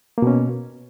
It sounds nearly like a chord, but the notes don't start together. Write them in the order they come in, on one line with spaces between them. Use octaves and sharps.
A#3 B2 C#4